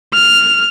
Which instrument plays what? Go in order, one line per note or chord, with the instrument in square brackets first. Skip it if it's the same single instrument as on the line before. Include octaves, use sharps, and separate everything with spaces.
[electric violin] F6